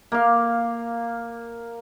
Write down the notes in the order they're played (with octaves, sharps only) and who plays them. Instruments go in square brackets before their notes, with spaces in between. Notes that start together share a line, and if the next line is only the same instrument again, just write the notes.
[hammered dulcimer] A#3 F5